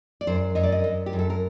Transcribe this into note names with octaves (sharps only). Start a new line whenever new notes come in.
D5
F#2 C5
F#2 D#5
D5
D#5
F#2
G4
F#2
A4
A#4